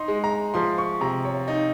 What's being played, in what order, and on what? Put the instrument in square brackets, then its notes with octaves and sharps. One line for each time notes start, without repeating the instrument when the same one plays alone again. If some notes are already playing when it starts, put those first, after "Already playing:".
Already playing: [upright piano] D#4 [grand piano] C6
[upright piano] G#3
[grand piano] A#5
[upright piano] F3 [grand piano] C6
[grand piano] C#6
[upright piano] C3 [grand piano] A#5
[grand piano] C#5
[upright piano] D#4